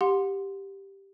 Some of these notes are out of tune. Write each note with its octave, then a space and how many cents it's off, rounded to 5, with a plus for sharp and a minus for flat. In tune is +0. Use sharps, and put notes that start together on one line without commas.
G4 +0 F#5 -30 C6 +0